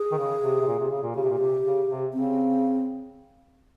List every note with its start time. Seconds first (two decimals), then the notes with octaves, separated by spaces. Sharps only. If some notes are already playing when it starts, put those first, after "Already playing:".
Already playing: G#4
0.12 D#3
0.18 C#3
0.42 C3
0.62 C3
0.67 A#2
0.79 C3
0.91 C#3
1.03 A#2
1.15 C#3 G4
1.24 C3
1.30 A#2
1.39 C3
1.64 C#3
1.89 C3
2.13 C#3 C4